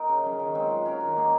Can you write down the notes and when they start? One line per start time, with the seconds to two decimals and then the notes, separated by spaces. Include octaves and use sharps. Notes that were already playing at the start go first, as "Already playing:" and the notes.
Already playing: D#4 A#4
0.09 C#3
0.24 F#3 C#4
0.40 D#3
0.55 G#3 C4 F4
0.70 F#3
0.85 C#4 F#4 A#4
1.00 D#3
1.16 A#3 C#4 G#4